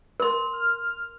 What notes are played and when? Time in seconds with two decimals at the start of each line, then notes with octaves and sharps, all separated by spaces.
0.20 A#4 C6
0.53 F6